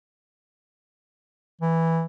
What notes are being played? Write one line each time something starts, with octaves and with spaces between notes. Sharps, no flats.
E3